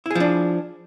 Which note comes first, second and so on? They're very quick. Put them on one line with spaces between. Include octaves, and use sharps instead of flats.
E4 G#4 F3 D4